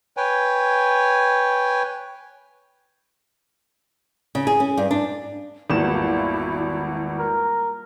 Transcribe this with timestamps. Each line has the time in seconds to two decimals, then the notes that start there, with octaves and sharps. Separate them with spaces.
0.17 B4 C#5 G5 G#5
4.35 C#3
4.47 G#4
4.60 C#4
4.77 G2
4.91 D4
5.70 G#1 E2 G3 A#3 E4 F4 E7
7.19 A#4